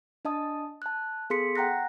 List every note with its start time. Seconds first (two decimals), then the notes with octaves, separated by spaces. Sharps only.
0.25 D4 D#5 A5 D#6
0.82 A5 F#6
1.30 B3 G#4 A4 C6 B6 C#7
1.56 F#5 G5 A#5 F#6 A#6